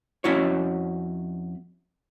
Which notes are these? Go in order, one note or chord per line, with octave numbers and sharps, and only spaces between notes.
F2 C#4 E4 F#4 C#5